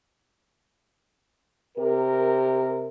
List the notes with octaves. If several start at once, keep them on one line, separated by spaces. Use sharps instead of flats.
C3 G4 A#4